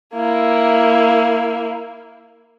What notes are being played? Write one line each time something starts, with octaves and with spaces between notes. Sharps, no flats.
A#3 E4